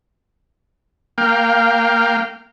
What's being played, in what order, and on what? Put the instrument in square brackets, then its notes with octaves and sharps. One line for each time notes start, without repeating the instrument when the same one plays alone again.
[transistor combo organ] A#3 F5 G5